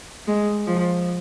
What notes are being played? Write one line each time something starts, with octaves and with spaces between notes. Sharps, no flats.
G#3
F3